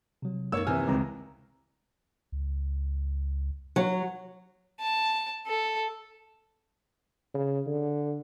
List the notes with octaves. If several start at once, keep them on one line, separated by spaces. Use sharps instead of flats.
C3 F#3
F#2 D#3 A#3 C#5 E6
D#2 C3 E3 G#5 F6
C#2 C#3 C4 A#5
C#2
F#3
A5
A4
C#3
D3